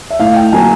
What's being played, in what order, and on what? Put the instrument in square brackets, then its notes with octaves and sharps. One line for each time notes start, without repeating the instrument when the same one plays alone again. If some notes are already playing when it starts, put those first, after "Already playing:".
[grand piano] E5
[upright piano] A2 [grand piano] F5
[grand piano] G5
[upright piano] F#3 A#3 [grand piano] G#5